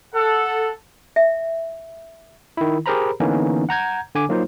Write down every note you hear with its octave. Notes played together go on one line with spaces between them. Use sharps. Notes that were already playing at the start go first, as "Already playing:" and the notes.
A4 F#5
E5
D#3 E4
G4 G#4 A#4 C5 A#5 B5
D3 E3 A#3 B3 C#4 D#4
F#5 A#5 G6 G#6
D3 G#5 D6
F#3 A#3 D#4 F4 C5